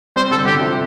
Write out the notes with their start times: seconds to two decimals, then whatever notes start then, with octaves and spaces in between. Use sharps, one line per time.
0.16 G3 C4 C5
0.31 D3 G3 A4
0.45 D3 G3 G4
0.61 C3 F3